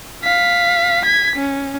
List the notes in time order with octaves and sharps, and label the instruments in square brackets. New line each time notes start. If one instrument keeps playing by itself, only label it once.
[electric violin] F5 B6
G#6 B6
C#4